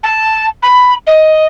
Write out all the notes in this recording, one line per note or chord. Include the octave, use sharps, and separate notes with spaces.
A5
B5
D#5